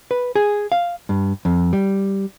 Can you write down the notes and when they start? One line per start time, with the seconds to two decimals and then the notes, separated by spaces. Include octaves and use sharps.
0.11 B4
0.36 G#4
0.72 F5
1.09 G2
1.45 F2
1.73 G3